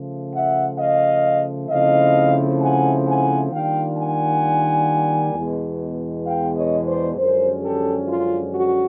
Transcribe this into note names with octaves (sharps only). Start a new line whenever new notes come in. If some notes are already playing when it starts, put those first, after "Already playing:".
Already playing: C#3 F3 A3
E5 F#5
D#5 F5
C#3 F3 A3 C4 E4 D#5 F5
F#5 G#5
F#5 G#5
D#3 G3 A#3 D4 F4 F5 G5
F#5 G#5
E2 B2 G#3
F5 G5
C#5 D#5
C5 D5
F#2 D3 F3 G#3 C#4 A#4 C5
G4 A4
F4
F#4